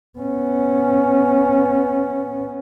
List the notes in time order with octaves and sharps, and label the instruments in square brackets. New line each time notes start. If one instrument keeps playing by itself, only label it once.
[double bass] B3 C#4